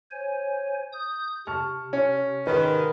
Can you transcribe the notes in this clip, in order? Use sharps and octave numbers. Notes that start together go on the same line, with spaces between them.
C5 C#5 G#5
D#6 G6
C3 A5 C#6 F6
C#4
G#2 D#3 B4